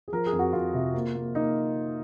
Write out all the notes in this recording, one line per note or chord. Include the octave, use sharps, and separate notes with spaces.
G#4
F3 A#4
G#4
F2
F#4
F2 F4
C3
A#3
A#3
A#3 D#4